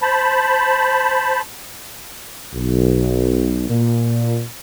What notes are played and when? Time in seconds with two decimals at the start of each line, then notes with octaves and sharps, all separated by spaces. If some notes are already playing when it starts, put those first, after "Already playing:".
0.02 C5 A5 B5
2.54 B1
3.68 A#2